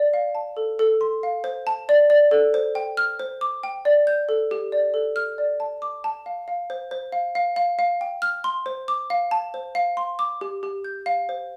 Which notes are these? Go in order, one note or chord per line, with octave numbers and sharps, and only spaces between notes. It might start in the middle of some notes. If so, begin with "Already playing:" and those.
Already playing: D5
F5
A5
A4
A4
C6
F5
C5
A5
D5
D5
A4
C5
G5
F6
C5
D6
G5
D5
G6
A4
G4
D5
A4
F6
D5
A5
D6
A5
F5
F5
C5
C5
F5
F5
F5
F5
G5
F6
C6
C5
D6
F5
A5
C5
F5
C6
D6
G4
G4
G6
F5
C5